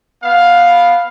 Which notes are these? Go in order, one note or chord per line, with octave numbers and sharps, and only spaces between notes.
B3 F5